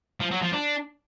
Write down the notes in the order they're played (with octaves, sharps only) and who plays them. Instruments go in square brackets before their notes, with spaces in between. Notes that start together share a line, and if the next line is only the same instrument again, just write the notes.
[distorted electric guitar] F3
F#3
F3
D4